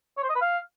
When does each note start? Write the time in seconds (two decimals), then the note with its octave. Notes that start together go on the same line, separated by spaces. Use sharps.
0.17 C#5
0.23 C5
0.29 D#5
0.35 B4
0.41 F5